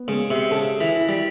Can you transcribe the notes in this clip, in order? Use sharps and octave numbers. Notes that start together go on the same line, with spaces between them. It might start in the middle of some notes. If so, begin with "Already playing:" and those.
Already playing: B3
C#3 G#3
C3
C#3 A4
E3
E4
G3